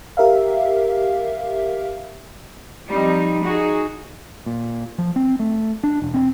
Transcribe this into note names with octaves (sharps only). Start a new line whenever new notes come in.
G4 A#4 E5 F5
F3 G3 C4 D#4
D#4 F#4 G#4
A#2
F3
C4
A3
D4
E1
C4